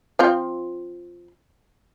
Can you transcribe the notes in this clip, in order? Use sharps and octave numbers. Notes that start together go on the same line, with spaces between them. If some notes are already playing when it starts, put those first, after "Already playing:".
F3 C4 F4